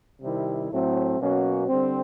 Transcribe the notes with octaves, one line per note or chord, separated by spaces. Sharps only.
C3 D#3 G3 C4 E4
A2 F#3 A3 C4
B2 F#3 A#3 C#4 F#4
D3 G3 C4